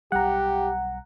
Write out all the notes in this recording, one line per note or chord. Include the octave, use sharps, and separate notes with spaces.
B1 G3 G4 F#5 A#5